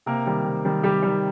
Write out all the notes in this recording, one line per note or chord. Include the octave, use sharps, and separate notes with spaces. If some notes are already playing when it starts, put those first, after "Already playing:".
C3 A#3 A#4
D#3 G3
C3
D#3 G3
C3 G3 G4
D#3 G3